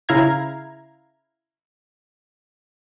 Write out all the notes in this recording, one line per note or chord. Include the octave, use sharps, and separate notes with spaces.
C#3 E4 F5 A#5 G#6